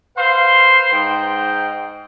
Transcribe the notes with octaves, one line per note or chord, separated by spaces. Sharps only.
B4 C5 F5 C6
G#2 G5